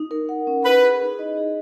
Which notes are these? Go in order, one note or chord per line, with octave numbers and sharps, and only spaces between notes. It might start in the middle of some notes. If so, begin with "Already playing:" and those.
Already playing: D#4
A#4
F#5
C#4
E4 B4
G#4
D#4
D#5
G#4